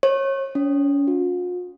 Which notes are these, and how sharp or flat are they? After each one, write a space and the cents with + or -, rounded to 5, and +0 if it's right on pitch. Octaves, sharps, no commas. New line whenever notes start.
C#5 -30
C#4 +35
F4 +45